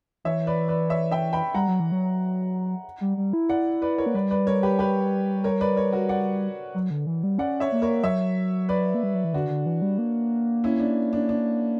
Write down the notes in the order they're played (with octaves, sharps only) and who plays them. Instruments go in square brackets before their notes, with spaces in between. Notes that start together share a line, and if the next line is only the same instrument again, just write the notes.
[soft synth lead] E3 [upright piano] C#5 E5
[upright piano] B4 D5
B4 D5
C#5 E5
E5 G5
G5 B5
[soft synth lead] G3 [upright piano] F#5 A#5
[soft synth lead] F#3
E3
F#3
G3
G3
E4
[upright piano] D5 F#5
B4 D5
A#4 C#5
[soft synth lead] A#3
[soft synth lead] G3 [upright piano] B4 D5
[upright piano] B4 D5
A#4 C#5
G4 B4
G4 B4
A#4 C#5
B4 D5
A#4 C#5
F#4 A#4
D5 F#5
[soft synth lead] F#3
D3
E3
G3
[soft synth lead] C#4 [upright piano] D5 F#5
[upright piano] C#5 E5
[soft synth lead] A#3
[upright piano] A#4 C#5
[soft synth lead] F#3 [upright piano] C#5 E5
[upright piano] B4 D5
[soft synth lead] A#3
G3
F#3
E3
[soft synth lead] D3 [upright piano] D4 F#4
[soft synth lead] D3
E3
G3
A#3
[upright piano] C#4 E4
D4
D4
D4